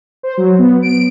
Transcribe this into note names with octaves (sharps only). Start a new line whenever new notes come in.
C5
F#3
B3
D7